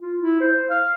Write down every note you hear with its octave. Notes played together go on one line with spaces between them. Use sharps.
F4
E4
C5
F5